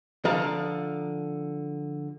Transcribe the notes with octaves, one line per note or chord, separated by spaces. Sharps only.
D3 F3 F5 A#5